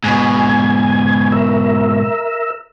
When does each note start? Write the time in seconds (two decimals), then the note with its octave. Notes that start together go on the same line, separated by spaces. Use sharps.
0.04 G#2 B2 G#5
1.32 A#4 E5